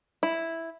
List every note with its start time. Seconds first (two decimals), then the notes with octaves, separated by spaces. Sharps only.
0.23 E4